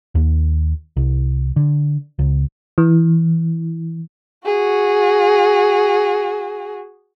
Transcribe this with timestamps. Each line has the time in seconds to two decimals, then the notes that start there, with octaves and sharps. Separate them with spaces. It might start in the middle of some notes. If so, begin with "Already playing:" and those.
0.15 D#2
0.97 C2
1.56 D3
2.19 C#2
2.78 E3
4.46 F#4 G#4